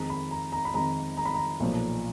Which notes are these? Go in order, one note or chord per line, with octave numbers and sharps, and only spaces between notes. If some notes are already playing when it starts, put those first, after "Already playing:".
Already playing: F2 D#3 G#3 A#5
B5
A#5
A#5
B5
F2 D#3 G#3 A#5
A#5
B5
A#5
B1 A#2 F3